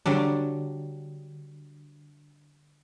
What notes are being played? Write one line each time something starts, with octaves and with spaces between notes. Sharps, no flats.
D3 F#3 G3 D4